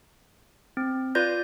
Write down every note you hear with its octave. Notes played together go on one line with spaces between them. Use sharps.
C4
F4 B4 D5 G6 A#6